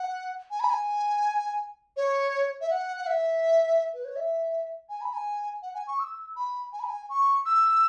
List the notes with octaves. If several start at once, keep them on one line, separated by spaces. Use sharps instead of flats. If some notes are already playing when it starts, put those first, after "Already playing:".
Already playing: F#5
G#5
B5
G#5
C#5
E5
F#5
F#5
E5
B4
C#5
E5
G#5
B5
G#5
F#5
G#5
C#6
E6
B5
G#5
B5
G#5
C#6
E6